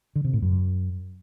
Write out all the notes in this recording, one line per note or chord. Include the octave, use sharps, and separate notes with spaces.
D3
C3
A2
F#2